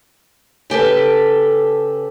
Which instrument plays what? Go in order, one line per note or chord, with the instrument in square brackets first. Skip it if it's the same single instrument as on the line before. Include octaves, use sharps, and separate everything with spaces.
[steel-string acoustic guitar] C#3 G4 A4 B4